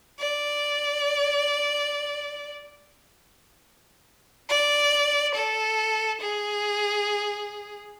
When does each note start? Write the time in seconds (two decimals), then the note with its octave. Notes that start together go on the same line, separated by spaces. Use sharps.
0.19 D5
4.49 D5
5.35 A4
6.21 G#4